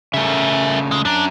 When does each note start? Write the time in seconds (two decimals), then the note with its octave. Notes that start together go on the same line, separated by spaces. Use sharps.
0.14 C#3 A3 A#4 E5
0.92 G#3
1.05 F#2 D4 A#5